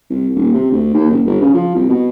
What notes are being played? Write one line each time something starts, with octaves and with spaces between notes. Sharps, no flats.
C2
D#1
C3
D2
D#2
F#1
G1
C#3
F3
C2
B2